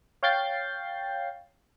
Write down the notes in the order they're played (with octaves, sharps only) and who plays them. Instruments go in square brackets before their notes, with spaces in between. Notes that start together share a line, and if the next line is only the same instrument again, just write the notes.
[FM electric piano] C#5 F5 G5 G6 A6 C7